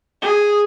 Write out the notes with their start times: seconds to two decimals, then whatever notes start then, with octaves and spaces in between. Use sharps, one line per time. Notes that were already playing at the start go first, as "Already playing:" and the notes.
0.21 G#4